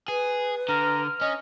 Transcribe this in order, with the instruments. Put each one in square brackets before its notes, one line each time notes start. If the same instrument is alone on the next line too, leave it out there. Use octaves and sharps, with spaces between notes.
[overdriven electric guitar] G#4 [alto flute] B4
[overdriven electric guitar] D3 [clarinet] A#5 [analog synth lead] F6
[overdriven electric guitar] C#4 [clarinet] D#5